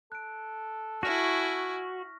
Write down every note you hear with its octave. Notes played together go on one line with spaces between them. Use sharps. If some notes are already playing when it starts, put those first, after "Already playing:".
A4 F#6 D7
E4 F#4 G#5 C#6 F6 A#6